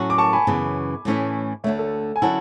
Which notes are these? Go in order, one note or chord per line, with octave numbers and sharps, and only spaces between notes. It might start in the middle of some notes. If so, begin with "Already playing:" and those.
Already playing: A2 F#3 A3 C#4 F#4
D6
A5 C#6
G#5 B5
F#2 C#3 E3 B3
A2 E3 A3 C#4 E4
D2 D3 A3 C#5 E5
A4 C#5
G#5
D3 F#3 C#4 E4 F#5 A5